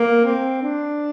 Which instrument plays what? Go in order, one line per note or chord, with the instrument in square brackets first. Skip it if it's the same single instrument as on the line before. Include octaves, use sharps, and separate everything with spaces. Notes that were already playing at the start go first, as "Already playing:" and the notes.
Already playing: [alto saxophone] A#3
C4
D4